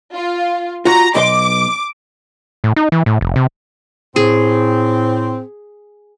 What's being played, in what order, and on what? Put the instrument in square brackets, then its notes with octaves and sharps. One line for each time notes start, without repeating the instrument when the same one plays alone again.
[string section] F4
[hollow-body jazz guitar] F4 F#4 [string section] A#5
[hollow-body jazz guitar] B1 D#5 C6 [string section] D6
[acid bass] A2
D#4
E3
A2
F1
C3
[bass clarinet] A2 [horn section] C4 [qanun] G#4